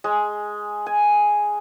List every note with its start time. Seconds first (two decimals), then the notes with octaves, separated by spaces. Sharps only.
0.04 G#3
0.86 G#5